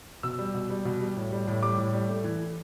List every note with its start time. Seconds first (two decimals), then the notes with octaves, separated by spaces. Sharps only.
0.23 B2 E6
0.39 G3
0.54 B2
0.70 G3
0.85 B2
1.00 G3
1.16 A2
1.32 G3
1.47 A2
1.63 G3 D6
1.78 A2
1.94 G3
2.09 A3
2.24 E3